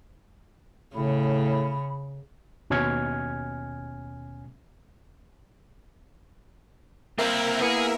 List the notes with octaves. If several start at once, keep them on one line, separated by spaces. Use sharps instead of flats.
A2 C#3 B5
D#2 B2 C#4 G#5 F6 G#6
A#3 C4 E4 A#4 E5
A#3 B3 E4 G#4 C#7